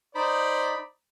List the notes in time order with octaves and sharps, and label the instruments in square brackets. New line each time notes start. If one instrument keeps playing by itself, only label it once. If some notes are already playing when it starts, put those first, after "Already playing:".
[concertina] D#4 B5 [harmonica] C5 D5